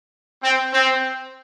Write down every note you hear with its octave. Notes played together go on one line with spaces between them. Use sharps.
C4
C4